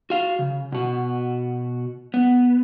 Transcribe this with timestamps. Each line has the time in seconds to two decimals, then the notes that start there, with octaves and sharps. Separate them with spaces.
0.10 F#4 F5
0.39 C#3
0.72 B2 F#4
2.14 B3